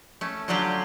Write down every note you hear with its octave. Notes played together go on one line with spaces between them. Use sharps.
A3 C#4
D3 F#3 C#4 F4 G4 G5